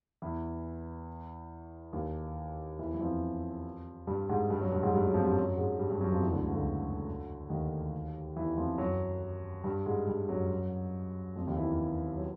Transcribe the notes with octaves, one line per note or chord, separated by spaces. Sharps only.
E2 E3
D#2 D#3
E2 E3
E3
F2 F3
G2 G3
G#2 G#3
G2 G3
F#2 F#3
G2 G3
G#2 G#3
G2 G3
F#2 F#3
F2 F3
G2 G3
F#2 F#3
G#2 G#3
G2 G3
G2 G3
F#2 F#3
F2 F3
E2 E3
D2 D3
C#2 C#3
D2 D3
D#2 D#3
E2 E3
F2 F3
F#2 F#3
G2 G3
G#2 G#3
G2 G3
F#2 F#3
F2 F3
D#2 D#3
E2 E3
F#3